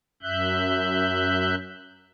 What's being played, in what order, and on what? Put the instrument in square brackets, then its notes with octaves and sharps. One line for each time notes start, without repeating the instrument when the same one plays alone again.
[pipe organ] F#2 E5 F#6 G6